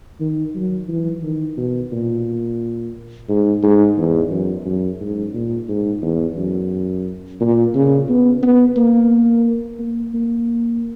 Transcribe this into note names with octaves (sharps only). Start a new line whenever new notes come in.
D#3
F#3
E3
D#3
B2
A#2
G#2
G#2
E2
F#2
F#2
G#2
A#2
G#2
E2
F#2
A#2
C#3
B3
B3
A#3
A#3
A#3